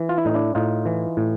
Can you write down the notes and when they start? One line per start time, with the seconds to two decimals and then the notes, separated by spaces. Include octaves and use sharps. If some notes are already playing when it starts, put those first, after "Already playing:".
Already playing: E3
0.09 F4
0.18 E4
0.25 A2 D#4
0.34 D4 E4
0.55 A2 D#4 F4
0.86 E3
1.17 A2